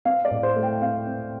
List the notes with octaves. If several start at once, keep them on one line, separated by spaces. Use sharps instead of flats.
C4 F5
D5
A2
C5
A3
G5
C4 F5
C4